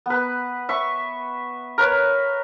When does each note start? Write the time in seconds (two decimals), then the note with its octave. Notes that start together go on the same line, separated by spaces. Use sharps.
0.06 B3 B4
0.69 E5 C#6
1.78 A#4 B4 C#5